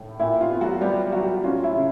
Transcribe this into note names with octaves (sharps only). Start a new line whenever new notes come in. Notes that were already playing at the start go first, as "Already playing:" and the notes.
Already playing: A2 A3
A#2 E4
F4
B3
F#3 F#4
G3 B3 G4
F#3 F#4
C#4 F4
E4
C#3